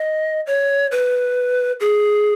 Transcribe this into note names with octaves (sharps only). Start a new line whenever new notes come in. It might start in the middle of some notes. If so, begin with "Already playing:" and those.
Already playing: D#5
C#5
B4
G#4